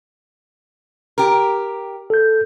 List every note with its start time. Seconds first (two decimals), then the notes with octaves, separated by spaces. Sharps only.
1.18 G4 A#4
2.10 A4 G6